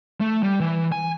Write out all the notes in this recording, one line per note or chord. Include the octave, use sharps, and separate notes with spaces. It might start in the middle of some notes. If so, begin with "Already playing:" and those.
A3
G3
E3
G#5